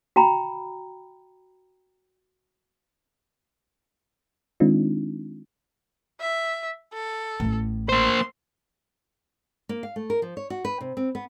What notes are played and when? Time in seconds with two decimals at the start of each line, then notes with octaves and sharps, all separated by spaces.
0.16 F#4 G5 A#5 B5
4.60 D#3 G#3 C4 D4 D#4 F4
6.21 E5
6.93 A4
7.40 A1 A2
7.89 A#3 C5 C6
9.69 A#3
9.83 F5
9.96 A3
10.10 A#4
10.22 F3
10.37 C#5
10.50 F#4
10.65 B4
10.81 C3
10.97 C4
11.15 B3